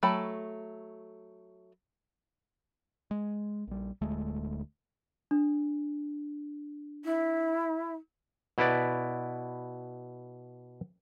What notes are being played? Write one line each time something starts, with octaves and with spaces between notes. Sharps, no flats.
F#3 A3 A4 G5 B5
G#3
A#1 G3
D1 D2 G#3 A3
D4
E4
B2 E4 B4 D5